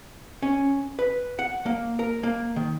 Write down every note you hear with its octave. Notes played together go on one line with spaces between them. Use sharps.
C#4
B4
F#5
A#3
A#4
A#3
D#3